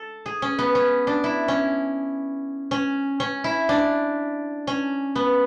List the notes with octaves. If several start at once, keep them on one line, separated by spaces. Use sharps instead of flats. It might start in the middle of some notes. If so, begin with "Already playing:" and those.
Already playing: A4
G#4
C#4
B3
C#4
D4
E4
C#4
C#4
C#4
E4
D4
C#4
B3